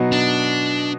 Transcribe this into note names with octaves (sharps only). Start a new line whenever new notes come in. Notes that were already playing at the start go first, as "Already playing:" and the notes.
Already playing: B2 F#3 B3 D#4 F#4
D4